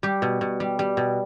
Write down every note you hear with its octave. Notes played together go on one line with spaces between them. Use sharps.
G3 G4
B2
B2
G3
G3
B2